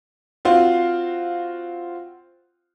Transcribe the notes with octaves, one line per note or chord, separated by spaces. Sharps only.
C4 F4 F#4 F5